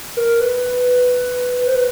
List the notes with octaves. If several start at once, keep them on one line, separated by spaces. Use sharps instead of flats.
A#4
B4
B4
C5
B4